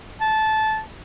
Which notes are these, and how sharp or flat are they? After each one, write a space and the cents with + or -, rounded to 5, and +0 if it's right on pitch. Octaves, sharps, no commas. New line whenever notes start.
A5 -15